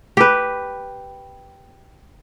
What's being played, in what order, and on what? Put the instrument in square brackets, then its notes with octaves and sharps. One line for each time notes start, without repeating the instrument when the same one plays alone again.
[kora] G4 B4